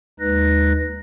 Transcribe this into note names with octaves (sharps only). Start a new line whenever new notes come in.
D#2 G#3 D#4 B4 F#6 A#6